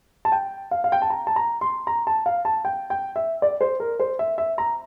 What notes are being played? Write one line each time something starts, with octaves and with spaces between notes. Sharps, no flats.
A5
G5
F5
F5
G5
A5
A#5
A5
A#5
C6
A#5
A5
F5
A5
G5
G5
E5
D5
C5
A#4
C5
E5
E5
A#5